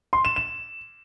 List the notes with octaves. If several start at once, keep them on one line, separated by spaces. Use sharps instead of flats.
C6
E7
E7